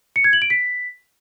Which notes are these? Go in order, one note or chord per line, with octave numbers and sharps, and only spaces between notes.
C#7
G#6
F#7
D7
B6